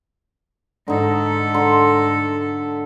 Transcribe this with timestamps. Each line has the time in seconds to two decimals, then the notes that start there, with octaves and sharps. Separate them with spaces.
0.88 G#2 D3 D#4 A4
1.54 D3 A#5 C6